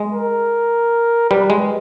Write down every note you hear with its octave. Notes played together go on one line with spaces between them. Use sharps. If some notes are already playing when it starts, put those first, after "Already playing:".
Already playing: G#3
A#4
G3 B4
G#3